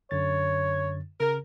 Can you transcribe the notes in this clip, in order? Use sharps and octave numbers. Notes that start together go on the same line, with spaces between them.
F#2 D3 C#5 A6
C#3 A#4